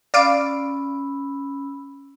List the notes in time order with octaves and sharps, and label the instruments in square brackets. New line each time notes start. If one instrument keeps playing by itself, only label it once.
[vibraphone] C#4 B5 E6 [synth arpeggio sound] D5 F5 D7